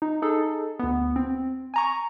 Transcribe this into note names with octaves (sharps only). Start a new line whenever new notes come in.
D#4
D#4 G#4 A4
D2 B3
C4
G#5 A#5 C#6